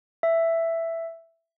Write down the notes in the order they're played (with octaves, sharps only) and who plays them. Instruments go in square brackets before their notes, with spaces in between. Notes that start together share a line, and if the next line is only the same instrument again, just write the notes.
[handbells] E5